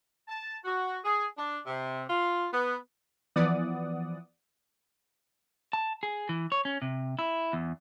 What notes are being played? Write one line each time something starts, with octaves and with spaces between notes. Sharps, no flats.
A5
F#4
G#4
D4
C3
F4
B3
E3 F3 B3 D5 F#5 D#6
A5
G#4
E3
C#5
C#4
C3
E4
E2